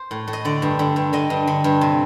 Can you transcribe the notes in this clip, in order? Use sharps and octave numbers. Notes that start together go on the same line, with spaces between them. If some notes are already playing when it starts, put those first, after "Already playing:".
Already playing: C5
A2
A2
D#5
D3 D5
G2
D3
G2
D3 D#5
G2
D3
G2
C3